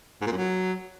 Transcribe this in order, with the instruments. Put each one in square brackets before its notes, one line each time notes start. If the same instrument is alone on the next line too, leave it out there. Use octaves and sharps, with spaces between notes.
[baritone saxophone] G#2
A#2
F#2
F#3